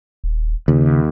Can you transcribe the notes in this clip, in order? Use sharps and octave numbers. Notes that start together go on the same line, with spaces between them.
D#1
D#2 C#3